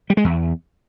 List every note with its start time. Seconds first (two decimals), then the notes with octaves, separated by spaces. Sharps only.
0.10 G3
0.17 G#3
0.24 E2